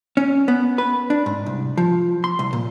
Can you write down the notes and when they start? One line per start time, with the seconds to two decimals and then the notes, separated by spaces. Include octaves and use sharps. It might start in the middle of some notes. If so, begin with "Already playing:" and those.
0.17 C#4
0.48 B3
0.78 B4
1.10 D4
1.26 G#2
1.46 C2
1.77 F3
2.24 C6
2.39 C2
2.53 A#2